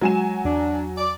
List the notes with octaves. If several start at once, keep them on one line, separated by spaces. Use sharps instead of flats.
F#3 G#3 G#5 E7
E2 D4
D5